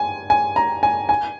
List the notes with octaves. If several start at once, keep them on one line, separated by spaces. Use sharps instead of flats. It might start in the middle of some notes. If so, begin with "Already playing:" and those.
Already playing: G#5
G#5
A#5
G#5
G#5